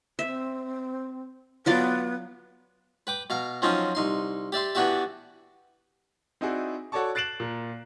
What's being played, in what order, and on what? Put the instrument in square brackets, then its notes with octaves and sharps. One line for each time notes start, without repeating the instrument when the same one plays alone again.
[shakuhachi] C4 [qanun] E5
[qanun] F#3 F4 D5 [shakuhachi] B3
[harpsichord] B4 G5 D6
B2 F5 A#5
F3 F#3 C4 C#4 D#4 F4
C2 D#4 C6
G4 D5 E5 C6
E3 B3 D4 F#4 G4 E5
[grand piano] C4 D#4 E4 F#4 G#4 D5
F#4 A4 C#5 D5 A5 C#6
F#6 A6 C7 D7 E7 F#7
A#2